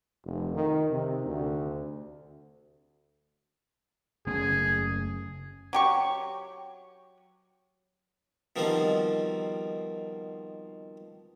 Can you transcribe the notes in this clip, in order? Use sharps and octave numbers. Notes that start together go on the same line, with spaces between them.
F1
D#3
C3
D2
F#1 A3 C#4 G#4
F#3 G4 C#6
B2 D#3 F3 G3 C4